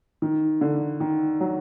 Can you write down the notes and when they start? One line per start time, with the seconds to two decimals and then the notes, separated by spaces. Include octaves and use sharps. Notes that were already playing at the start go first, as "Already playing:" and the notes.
0.22 D#3
0.61 D3
1.00 D#3
1.40 F#3